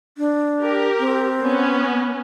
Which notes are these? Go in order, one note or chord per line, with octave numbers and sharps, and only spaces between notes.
D4
G4 A#4
C4
B3 C#4